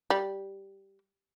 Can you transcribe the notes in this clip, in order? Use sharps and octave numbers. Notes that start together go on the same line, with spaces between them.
G3